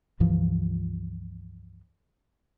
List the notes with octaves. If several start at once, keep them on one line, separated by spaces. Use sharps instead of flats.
C#2 G2 E3 F3